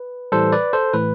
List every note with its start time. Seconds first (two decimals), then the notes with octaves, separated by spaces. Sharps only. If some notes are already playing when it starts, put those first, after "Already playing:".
Already playing: B4
0.32 A2 E3 G3 A4 C5
0.52 B4 D5
0.73 A4 C5
0.94 A2 E3 A3 B4